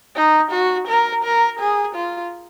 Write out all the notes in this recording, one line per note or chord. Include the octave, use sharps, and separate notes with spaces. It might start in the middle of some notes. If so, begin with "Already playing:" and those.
D#4
F#4
A#4
A#4
G#4
F4